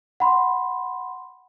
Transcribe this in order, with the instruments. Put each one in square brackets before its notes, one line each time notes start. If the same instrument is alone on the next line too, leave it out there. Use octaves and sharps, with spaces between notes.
[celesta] F#5 B5 C6